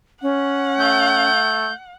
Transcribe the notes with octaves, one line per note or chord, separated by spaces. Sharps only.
C#4 F#5
A3 G6